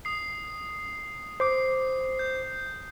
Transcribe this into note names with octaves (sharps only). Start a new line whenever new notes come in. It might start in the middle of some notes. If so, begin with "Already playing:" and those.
D#6 C7
C5 D6 C7
G6